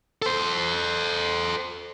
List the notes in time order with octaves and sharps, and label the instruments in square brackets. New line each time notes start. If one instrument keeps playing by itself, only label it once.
[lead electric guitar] A4 C5